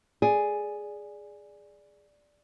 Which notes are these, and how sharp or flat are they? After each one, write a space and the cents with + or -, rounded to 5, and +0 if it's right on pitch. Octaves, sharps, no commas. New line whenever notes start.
G#4 +0 D5 +0